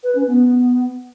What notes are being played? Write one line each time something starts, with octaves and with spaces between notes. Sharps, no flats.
B4
C#4
B3